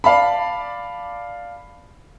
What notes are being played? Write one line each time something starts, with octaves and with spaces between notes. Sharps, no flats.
D5 F5 A5 B5